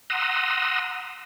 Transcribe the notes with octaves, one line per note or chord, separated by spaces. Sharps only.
F#5 A#5 C6 D#6 E6